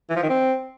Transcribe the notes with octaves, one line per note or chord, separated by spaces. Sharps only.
E3
F3
D#3
C4